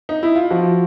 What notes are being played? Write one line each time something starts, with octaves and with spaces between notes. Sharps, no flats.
D#4
E4
F4
F3 F#4